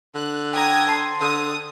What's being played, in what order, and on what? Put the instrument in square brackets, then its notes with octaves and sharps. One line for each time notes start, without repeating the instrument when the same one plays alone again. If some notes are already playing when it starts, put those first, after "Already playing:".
[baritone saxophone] D3 [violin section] F#6
[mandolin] G4 A#5 [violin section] G5 D#6 G#6
[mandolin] C5 A5 C6
[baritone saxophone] D3 [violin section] D#6